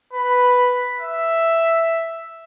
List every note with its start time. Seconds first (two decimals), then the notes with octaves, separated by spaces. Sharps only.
0.13 B4
1.00 E5